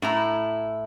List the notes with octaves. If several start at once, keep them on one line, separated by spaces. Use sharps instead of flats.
A2 E4 A#5